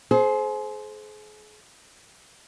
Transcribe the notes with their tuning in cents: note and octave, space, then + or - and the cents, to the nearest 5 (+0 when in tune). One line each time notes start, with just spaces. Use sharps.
G#4 +40 C5 +0